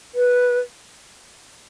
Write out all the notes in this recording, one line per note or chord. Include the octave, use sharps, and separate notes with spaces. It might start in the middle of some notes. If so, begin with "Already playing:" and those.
B4